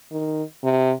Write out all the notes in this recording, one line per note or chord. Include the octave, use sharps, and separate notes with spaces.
D#3
C3